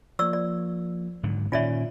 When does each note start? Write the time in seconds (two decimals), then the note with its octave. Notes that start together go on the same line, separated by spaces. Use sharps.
0.19 F3 A#3 D5 C#6 E6
0.33 D5
1.23 G#2 D3 F#3
1.52 A#2 D#3 C#4 F4 D5 E5